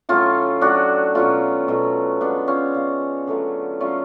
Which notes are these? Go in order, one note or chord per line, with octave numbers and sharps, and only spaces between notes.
A2 F#3 A3 C#4 F4
A2 F#3 A3 D4 F#4
B2 F#3 A3 C#4 F4
B2 F#3 A3
C#3 G#3 B3 D4
C#4 F4
C#3 G#3
D3 F#3 A3
D3 F#3 A3 C#4 F4